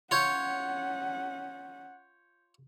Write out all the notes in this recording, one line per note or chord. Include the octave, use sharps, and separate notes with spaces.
C#4 F4 C#5 F#5 G6 G#6 C#7